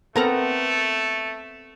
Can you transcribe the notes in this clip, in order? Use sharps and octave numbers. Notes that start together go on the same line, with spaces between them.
A3 B3 C4 A4 A#4 F#5 A#5